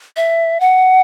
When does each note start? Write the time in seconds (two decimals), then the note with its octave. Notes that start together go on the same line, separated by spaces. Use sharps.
0.16 E5
0.60 F#5